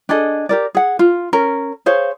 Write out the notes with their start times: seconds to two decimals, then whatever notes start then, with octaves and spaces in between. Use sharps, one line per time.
0.09 D4 G#4 A4 D#5
0.49 G4 A#4 D5
0.75 G#4 F#5
0.99 F4
1.33 C#4 A#4
1.86 G#4 C5 C#5 F5